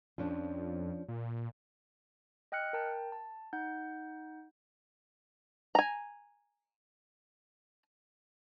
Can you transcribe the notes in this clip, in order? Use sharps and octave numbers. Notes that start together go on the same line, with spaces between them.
F2 F3 C#4 D4
A#2
D#5 G5 F6 F#6 C#7
A#4 G5 A5
A5
D#4 F#5 G6
G#5 A#5